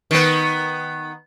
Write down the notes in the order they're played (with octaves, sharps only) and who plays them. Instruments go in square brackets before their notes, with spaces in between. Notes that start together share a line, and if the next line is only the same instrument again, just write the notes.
[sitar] D#3 B3